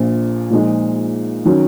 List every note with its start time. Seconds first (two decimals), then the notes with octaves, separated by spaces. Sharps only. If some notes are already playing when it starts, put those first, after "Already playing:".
Already playing: A#1 A#2 F3
0.50 A#2 F3 G#3 D#4 G#4
1.45 D#3 F#3 C#4